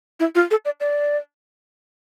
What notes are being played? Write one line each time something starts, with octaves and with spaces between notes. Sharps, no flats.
E4
F4
A4
D5
D5